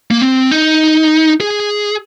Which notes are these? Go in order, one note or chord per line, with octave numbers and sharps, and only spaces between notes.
A#3
C4
D#4
G#4